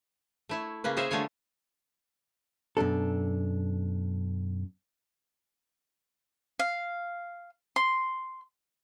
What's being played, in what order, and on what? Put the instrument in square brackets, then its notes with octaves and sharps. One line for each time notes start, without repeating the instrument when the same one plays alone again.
[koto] A3 E4 C#5
C#3 A#3 C#4 B4
G#4 A#4 C5 C#5 E5
D3 G3 A3 F4 C#5 G#5
[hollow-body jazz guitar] F#2 B2 D4 A4
[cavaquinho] F5
C6